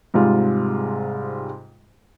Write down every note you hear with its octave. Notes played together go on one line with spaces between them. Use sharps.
G#2 C3 G3 G#3 F4